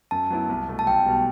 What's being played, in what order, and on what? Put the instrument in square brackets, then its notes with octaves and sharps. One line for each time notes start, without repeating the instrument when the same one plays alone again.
[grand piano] F#2 [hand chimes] A5
[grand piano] F#3 B3 E4
C2
B2 A3
[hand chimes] A5
[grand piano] B1 [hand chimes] G5
[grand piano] B2 G3